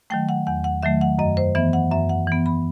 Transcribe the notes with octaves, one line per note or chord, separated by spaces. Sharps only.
D#3 F#3 A3 G5
F#5
E2 F#5
F#5
D#3 F#3 A3 E5
F#5
F#2 D#5
C5
E3 B3 E5
F#5
F#2 E5
F#5
E3 B3
B5